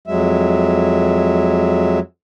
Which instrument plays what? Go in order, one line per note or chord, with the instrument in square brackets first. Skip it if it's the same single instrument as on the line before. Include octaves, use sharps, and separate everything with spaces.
[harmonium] F2 F#3 G#3 E5